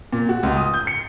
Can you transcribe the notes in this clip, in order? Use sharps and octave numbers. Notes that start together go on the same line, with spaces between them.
A#2
F#4
C#2
D#6
G6
C#7